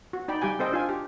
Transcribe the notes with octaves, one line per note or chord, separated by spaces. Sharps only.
F#4
D#4 D5 G5 B5
G3 G4 G5 G#5
C4 A4 C5 D#5 G5
D4 F4 G#5
G4